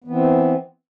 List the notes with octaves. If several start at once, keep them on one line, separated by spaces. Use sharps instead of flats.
E3 B3 C4